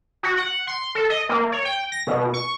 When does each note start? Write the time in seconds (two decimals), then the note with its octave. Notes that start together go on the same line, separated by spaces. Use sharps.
0.23 F#4
0.38 F#5
0.67 C6
0.95 A4
1.10 D#5
1.29 A#3
1.52 C#5
1.65 G5
1.92 A#6
2.07 B2
2.34 C#6